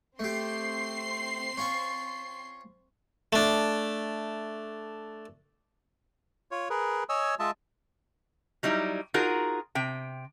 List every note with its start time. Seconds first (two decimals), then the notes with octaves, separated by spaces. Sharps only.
0.19 A3 C4 G4 C6 C7
1.57 C#4 F4 C#6
3.33 A3 D4
6.51 F4 C#5
6.70 G#4 A#4 B4
7.09 C#5 D#5 G#5 E6
7.39 G#3 F4 D#5 E5 A5
8.63 F#3 G3 D#4 E4
9.14 D#4 F4 F#4 G#4 A#4
9.75 C3 G5